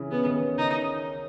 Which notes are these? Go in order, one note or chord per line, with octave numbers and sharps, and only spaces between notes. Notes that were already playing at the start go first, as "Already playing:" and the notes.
Already playing: C#3 E3
C#3 B3
D#3
C#3
C#3 D#4